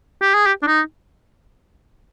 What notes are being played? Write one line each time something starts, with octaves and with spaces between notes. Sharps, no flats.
G4
G#4
G4
D4
D#4